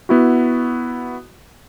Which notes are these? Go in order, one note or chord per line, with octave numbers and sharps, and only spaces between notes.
B3 E4 F#4